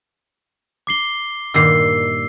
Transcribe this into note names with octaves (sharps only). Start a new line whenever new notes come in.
D6 C7 G7
G2 A#2 D#3 E6 C7